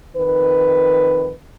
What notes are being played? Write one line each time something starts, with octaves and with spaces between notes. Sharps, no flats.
F2 D#3 B4